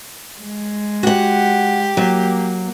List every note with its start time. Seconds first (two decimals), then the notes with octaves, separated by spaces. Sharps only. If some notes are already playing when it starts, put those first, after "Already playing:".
0.41 G#3
1.03 F#4 G4 F#5
1.97 F#3 A#3